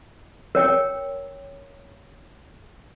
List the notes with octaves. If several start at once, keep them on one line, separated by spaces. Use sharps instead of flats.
A#4 C#5 G5